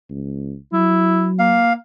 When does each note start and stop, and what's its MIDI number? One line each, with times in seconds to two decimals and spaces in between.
0.10 0.56 37
0.73 1.61 54
0.73 1.29 64
1.39 1.74 58
1.39 1.73 77